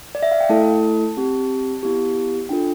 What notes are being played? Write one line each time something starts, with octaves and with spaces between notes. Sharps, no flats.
D5
E5
F5
G5
A3 E4 A4 A5
C4 G4
B3 E4 G4
D4 F4 A4 G5